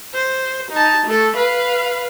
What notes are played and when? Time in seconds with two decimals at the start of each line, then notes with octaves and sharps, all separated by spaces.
0.14 C5
0.71 D#4 A5
1.06 A3 A4
1.36 B4 F5